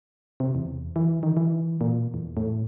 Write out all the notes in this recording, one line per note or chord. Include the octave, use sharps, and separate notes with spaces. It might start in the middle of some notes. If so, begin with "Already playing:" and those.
C3
E2
E3
D#3
E3
A#2
E2
A2